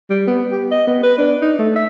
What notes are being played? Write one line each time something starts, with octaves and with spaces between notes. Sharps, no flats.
G3
B3
G4
D#5
B3
B4
D4
D#4
A3
E5